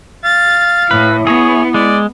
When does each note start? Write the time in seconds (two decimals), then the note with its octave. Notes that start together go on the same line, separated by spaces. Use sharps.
0.24 F5 A6
0.91 A2 E4 B4
1.27 B3 G#4 C#5
1.74 G#3 D5